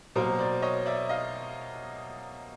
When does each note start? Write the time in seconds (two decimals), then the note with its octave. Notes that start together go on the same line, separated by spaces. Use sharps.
0.15 B2 F#3 A#3 A#4 C5
0.39 C5 D5
0.62 C#5 D#5
0.86 D5 E5
1.09 D#5 F5